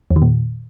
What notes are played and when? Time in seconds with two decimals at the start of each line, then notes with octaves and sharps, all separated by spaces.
0.11 E2
0.16 D#3
0.22 A#2